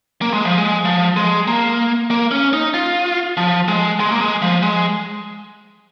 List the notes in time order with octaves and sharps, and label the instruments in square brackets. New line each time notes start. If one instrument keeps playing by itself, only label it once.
[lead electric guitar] A#3
G#3
F3
G#3
F3
G#3
A#3
A#3
C#4
D#4
F4
F3
G#3
G#3
A#3
G#3
F3
G#3